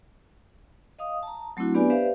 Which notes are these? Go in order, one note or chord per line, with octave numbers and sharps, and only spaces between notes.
D#5 F5 D#6
A5 A#5
F#3 A3 C4 D4 E4 F#4
B3 D4 G4 B4 D5 G#5
G4 B4 C5 D5 E5 F5